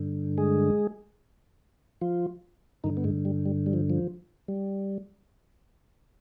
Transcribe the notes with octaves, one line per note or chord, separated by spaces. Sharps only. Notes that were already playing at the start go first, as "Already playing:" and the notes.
Already playing: G2 D3
G#3 G#4
F3 F4
G2 D3 D#3 D#4
B3
G#2 G#3
G3
G3
G3
F3
F3
G3